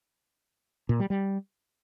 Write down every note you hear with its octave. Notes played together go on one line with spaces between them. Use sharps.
A#2
G3
G3